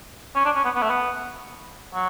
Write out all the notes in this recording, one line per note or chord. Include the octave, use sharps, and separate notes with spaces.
C#4
D4
C#4
B3
B3
A3
B3
F#3